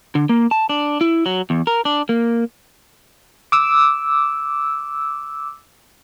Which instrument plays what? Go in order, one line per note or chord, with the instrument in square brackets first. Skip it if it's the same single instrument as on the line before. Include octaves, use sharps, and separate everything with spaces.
[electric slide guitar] D3
A#3
A5
D4
E4
F#3
E2
A#4
D4
A#3
[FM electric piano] D6 E6